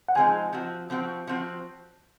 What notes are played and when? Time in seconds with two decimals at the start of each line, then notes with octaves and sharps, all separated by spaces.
0.08 F#5
0.15 F3 G#3 C4 D#4 G#5
0.53 F3 C4 F#4
0.90 F3 C4 F#4
1.27 F3 C4 F#4